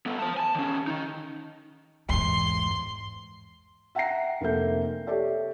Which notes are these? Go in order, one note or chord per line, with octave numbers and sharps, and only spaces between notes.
B3 A4
C5 A5
G#5 A5
D#3 C#4
D#3 D#4
E2 G#2 C6
E5 F#5 G5 A#5 A#6 C7
F1 A#3 C4 A4 E5 G6
G4 A4 C#5 D5 E5